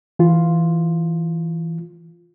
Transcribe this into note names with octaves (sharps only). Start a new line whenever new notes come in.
E3 F4